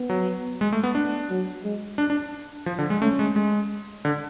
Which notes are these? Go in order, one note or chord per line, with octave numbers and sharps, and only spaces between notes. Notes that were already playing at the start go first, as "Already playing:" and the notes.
Already playing: B3
F#3
G#3
A3
B3
D4
F#3
G#3
D4
D4
F3
D3
G#3
A3 C#4
G#3
G#3
D3